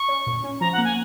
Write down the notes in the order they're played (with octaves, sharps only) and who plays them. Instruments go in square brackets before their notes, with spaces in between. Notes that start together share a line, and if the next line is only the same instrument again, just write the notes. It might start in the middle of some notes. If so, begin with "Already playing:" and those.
Already playing: [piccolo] C#6
[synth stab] C#4
A#2
C#4
[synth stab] F3 [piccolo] A#5
[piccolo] F#5
[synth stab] A#3
[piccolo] G#5